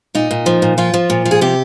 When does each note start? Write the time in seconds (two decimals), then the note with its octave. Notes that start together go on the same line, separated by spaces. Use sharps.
0.15 A#2 D#4
0.31 A#2
0.46 F3
0.62 A#2
0.78 F3 F4
0.94 F3
1.10 A#2
1.26 F3
1.31 G#4
1.41 C3 G4